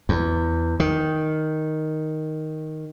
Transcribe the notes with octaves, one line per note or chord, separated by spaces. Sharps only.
E2
D#3